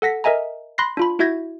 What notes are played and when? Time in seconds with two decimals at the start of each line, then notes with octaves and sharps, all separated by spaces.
0.02 A4 F#5 A#6 B6
0.24 A#4 D#5 E5 G#5 A#5
0.78 B5 C6 F#6 A#6 C7
0.97 D4 F4 B5
1.19 E4 F#4 E5 G6 G#6 A#6